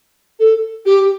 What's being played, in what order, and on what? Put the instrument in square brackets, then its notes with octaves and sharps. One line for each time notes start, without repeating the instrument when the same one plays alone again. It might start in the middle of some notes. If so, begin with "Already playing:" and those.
[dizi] A4
G4